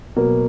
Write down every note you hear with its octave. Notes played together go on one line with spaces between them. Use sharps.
B2 F#3 A#3